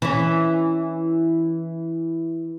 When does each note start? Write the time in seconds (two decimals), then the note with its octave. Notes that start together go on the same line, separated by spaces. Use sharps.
0.02 E3 C#4